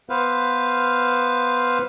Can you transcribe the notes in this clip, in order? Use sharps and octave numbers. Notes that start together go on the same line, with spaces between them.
B3 B4 C5 F5